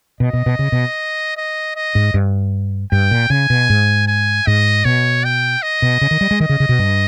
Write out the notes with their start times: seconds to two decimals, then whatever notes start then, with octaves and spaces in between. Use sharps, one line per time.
0.20 B2 D#5
0.33 B2
0.46 B2
0.59 C#3
0.72 B2
1.37 D#5
1.76 D#5
1.95 G#2
2.14 G2
2.91 G2 G5
3.11 A#2
3.30 C#3 G#5
3.50 B2
3.70 G#2
4.07 G#5
4.47 G#2 D#5
4.85 B2 C#5
5.24 G5
5.62 D#5
5.82 B2
6.01 C#3
6.11 D#3
6.21 G3
6.31 G#3
6.40 D#3 D#5
6.49 C#3
6.60 C#3
6.69 B2
6.79 G2